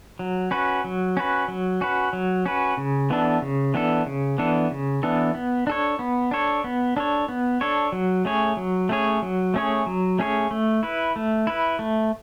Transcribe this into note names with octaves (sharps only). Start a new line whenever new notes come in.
F#3
C#4 F#4 B4
F#3
C#4 F#4 B4
F#3
C#4 F#4 B4
F#3
C#4 F#4 B4
C#3
E3 B3 D4 A4
C#3
E3 B3 D4 A4
C#3
E3 B3 D4 A4
C#3
E3 B3 D4 A4
B3
D4 A4 C#5
B3
D4 A4 C#5
B3
D4 A4 C#5
B3
D4 A4 C#5
F#3
A3 C#4 G#4 C#5
F#3
A3 C#4 G#4 C#5
F#3
A3 C#4 G#4 C#5
F#3
A3 C#4 G#4 C#5
A3
E4 B4
A3
E4 B4
A3